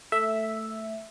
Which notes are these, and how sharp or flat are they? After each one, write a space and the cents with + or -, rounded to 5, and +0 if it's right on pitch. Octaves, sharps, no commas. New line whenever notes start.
A3 +5 E5 +0